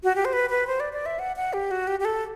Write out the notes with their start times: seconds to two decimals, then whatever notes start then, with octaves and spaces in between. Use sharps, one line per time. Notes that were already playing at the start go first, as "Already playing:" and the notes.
0.04 F#4
0.16 G4
0.25 C5
0.33 B4
0.50 B4
0.67 C5
0.80 D5
0.93 D5
1.06 E5
1.19 F#5
1.36 F#5
1.53 G4
1.71 F#4
1.87 G4
2.00 G4
2.05 A4